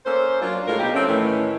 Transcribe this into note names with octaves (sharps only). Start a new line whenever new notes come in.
A#3 C#4 A4 C5
F#3 A#3 D4 F4
A2 F#3 G#3 F4 A#4
B2 D#4 G4
F3 A3 C4 C#4
A2 D#3 E3 A3 C#4